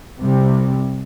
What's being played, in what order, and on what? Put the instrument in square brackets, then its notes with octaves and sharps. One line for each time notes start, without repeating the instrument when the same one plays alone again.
[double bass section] C2 C3 G3